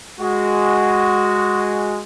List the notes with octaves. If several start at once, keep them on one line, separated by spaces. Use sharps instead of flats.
G#3 F#4